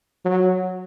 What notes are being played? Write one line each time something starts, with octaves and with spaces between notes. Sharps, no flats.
F#3